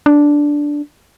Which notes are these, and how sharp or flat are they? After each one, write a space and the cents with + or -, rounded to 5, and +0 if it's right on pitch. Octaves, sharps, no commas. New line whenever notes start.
D4 -5